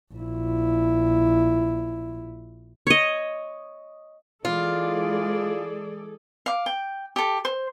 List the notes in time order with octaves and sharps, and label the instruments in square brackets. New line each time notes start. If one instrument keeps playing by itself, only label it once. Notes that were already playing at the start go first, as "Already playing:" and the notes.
[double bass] A#1 E4
[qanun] C#5 D#5
[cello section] E3 G#3 D5 [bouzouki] F4 [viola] G#4 A4
[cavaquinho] F5 D6
G5
G4 A4
C5